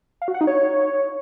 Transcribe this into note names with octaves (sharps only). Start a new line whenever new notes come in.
F5
F#4
F#5
D#4
C#5